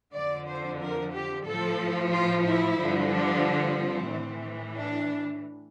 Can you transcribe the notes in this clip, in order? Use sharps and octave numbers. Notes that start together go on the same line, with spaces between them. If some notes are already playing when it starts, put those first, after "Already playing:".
F2 D3 F3 D5
C5
A#4
G4
A2 F3 A4
F4
E4
G2 D3 F3
D4
C4
A2 E3
D4